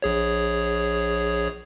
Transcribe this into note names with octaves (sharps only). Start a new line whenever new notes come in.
A#1 G#4 C#5